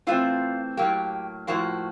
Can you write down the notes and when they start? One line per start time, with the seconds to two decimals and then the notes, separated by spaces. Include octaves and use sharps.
0.07 E3 A3 C4 F4
0.77 A2 F#3 A#3 G4
1.47 A2 F3 A#3 F#4